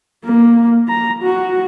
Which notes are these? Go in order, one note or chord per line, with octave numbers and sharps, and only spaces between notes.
A#3
A#5
F#4